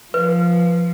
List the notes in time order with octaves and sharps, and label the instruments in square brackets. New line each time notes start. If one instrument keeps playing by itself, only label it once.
[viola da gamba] F3 [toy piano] B4